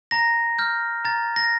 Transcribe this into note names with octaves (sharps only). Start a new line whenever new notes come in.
A#5 A#6
F6 G6
A#5 A6
A#6